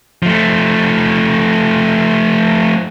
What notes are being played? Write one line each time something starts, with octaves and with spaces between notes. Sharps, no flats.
F3 A3